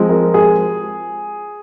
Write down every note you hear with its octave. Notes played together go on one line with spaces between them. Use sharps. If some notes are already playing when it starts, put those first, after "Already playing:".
Already playing: F3 G#3 C4
A#4
G#4